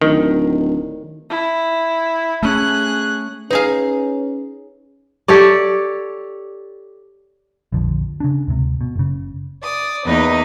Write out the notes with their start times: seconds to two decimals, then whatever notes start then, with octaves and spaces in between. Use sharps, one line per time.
0.01 D1 D#3
1.30 E4
2.43 A3 C#4 G#4 F#6
3.51 C#4 D#4 G#4 B4 F5 G#5
5.28 G4 A4 C#5 D5
7.72 A#1 F2 D3 F3
8.20 C#3 C#4 D4
8.47 D2 G#2 C3
8.81 B2
8.96 F#1 C#3
9.64 D5 D#6
10.05 E2 A#3 D#4 B4 D#5